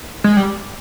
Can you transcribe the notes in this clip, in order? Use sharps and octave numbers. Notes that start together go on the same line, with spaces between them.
G#3
G3